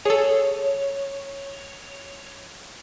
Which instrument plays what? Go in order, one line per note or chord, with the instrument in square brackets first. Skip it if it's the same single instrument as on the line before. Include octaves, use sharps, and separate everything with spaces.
[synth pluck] G#4 A4 [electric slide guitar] C#5